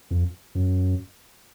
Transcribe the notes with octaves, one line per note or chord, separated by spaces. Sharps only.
F2
F#2